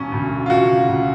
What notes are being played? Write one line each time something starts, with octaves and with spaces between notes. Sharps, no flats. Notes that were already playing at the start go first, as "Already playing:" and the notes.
Already playing: E1 C#4
D2
F4
C#3 F#4
D2